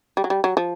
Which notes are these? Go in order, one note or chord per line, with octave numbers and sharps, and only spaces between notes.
G3
F#3
G3
F#3
F3